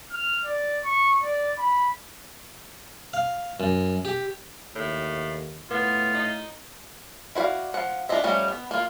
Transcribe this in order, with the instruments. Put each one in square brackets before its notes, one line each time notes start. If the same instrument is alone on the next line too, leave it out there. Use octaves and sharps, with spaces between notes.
[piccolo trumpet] F6
D5
C#6
D5
B5
[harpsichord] F5
F#2
G4
[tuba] D#2 [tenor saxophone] A2
[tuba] A2 [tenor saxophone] B3 [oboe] F4
[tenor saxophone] D#4
[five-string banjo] E4 F#4 C5 D5 F5
F3 F#5
D4 E4 F4 D#5 E5
F3 G3 A3 C#4 D#4
B3
A#3 F4